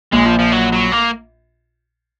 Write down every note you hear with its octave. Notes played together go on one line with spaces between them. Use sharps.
A#1 A#2 G#3
F3
F3
F#3
F#3
A#3